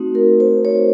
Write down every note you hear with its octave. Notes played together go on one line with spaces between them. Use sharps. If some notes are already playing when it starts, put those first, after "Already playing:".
Already playing: A3 C4 D#4 F#4
A#4
C5
C#5